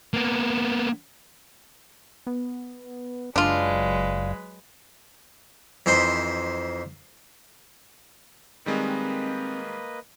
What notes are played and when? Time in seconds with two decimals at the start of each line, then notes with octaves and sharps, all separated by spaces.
0.14 A#3 B3
2.27 B3
3.36 F#1 F#3 G#3 D4 F4 B4
5.86 F2 E3 D#4 C5 B5 C6
8.66 D#3 G3 G#3 A#3 C4 B4 D#5